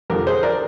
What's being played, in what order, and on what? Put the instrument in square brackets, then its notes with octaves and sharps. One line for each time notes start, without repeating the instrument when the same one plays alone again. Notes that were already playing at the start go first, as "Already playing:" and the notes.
[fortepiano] F2 D3 F3 G4 A#4
G#4 C5
A#4 D5